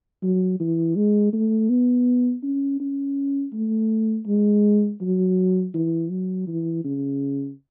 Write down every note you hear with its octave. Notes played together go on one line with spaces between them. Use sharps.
F#3
E3
G#3
A3
B3
C#4
C#4
A3
G#3
F#3
E3
F#3
E3
C#3